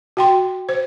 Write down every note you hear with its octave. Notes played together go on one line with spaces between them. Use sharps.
F#4 G5 C6
C5